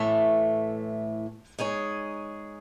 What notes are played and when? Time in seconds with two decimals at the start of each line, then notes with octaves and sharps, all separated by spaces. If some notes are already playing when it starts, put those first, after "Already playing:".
Already playing: A2 E3 A3
1.58 G#3 D#4 G#4 C#5